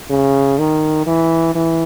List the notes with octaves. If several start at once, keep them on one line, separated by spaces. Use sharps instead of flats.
C#3
D#3
E3
E3